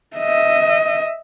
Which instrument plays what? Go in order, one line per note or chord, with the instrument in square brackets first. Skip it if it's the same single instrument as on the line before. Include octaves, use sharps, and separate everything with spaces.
[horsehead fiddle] D#5 E5